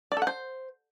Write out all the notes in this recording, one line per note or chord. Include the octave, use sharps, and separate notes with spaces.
D5
A4
F#5
C5